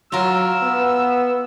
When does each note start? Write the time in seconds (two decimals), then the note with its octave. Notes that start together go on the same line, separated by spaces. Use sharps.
0.12 F#3 F4 A#4 E6
0.62 B3